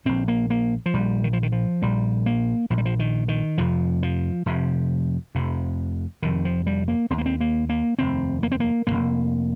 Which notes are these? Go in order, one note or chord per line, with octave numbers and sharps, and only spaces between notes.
A#1 A#2 C4
A#3
A#3
F3
A#1 A#2 G3
D#3
F3
D#3
F3
A#1 A#2 G3
A#3
A#1 A#2 F3
G3
F3
D#3
D#3
F1 F2 C3 F3
F3
F1 F2 C3
F1 F2 C3
F1 F2 C3 D#3
F3
G3
A#3
F1 C4
D#2 A#3
C4
A#3
A#3
F1 D#2 C4
A#3
C4
A#3
F1 D#2 A#3